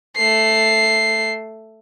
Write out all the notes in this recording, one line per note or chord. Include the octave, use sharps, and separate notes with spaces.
A3 C7